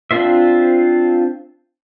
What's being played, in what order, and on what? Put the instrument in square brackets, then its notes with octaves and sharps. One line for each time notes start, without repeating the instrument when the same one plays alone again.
[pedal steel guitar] C4 D4 F4 C5 E5